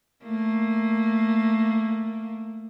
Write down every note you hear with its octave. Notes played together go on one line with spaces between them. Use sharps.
A3 A#3